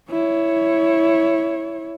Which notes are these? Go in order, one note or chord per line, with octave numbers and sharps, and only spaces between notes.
E4 C#5